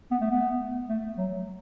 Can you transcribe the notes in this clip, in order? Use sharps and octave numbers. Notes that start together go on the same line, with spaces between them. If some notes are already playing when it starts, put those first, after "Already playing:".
B3
A3
B3
A3
F#3